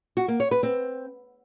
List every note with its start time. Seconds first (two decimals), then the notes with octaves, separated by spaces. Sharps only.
0.17 F#4
0.28 A#3
0.40 C#5
0.51 B4
0.63 C4